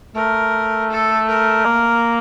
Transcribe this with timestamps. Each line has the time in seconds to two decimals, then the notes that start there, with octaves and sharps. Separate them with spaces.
0.15 A3 A#4
0.90 A4
1.28 A#4
1.65 A#3